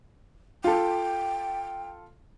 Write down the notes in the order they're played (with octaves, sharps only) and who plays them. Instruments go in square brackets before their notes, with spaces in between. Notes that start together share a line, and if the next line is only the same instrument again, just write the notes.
[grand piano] F4 A4 [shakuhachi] G5